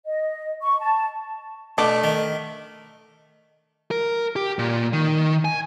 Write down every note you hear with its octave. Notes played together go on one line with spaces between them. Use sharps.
D#5
C#6
A5
B2 A3 D4
D#3
A#4
G4
A#2
D#3
G#5